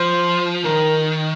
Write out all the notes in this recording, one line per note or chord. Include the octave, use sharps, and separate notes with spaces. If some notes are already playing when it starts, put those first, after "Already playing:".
Already playing: F3 C5
D#3 A#4